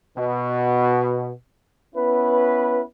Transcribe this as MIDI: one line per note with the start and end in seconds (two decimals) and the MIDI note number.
0.18 1.31 47
1.95 2.82 59
1.95 2.82 61
1.95 2.82 64
1.95 2.82 71